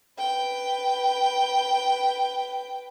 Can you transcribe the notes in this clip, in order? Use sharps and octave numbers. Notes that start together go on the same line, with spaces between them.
B4 G5